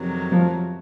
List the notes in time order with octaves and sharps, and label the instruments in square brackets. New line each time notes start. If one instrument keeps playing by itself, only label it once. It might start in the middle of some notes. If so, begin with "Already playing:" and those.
Already playing: [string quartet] F2 C3 D#3 F#3
[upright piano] F3